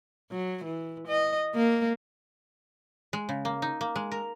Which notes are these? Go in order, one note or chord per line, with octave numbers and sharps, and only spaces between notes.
F#3
E3
D#5
A#3
G#3
C#3
A#3
D#4
A#3
G#3
A#4